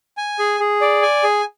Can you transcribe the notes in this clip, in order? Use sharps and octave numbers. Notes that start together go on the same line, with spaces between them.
G#5
G#4
G#4
D5
G#5
G#4